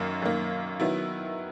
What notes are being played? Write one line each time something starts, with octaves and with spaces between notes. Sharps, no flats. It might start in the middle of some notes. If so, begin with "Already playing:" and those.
Already playing: F#2 D#3 A#3
F#2 D#3 A#3
D#3 F#3 B3 E4